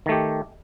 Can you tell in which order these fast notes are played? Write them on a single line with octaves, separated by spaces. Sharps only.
D#3 A3 G4